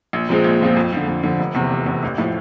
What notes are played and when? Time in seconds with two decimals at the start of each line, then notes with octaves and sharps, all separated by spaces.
0.13 A#1
0.29 A#2 F3 G#3 C4
0.44 A#1
0.61 A#2 F3 G#3 C4
0.77 F2
0.93 D3 F3
1.08 F2
1.23 D3 F3
1.40 F1
1.55 E2 C3
1.71 F1
1.86 E2 C3
2.03 A1
2.18 A2 F3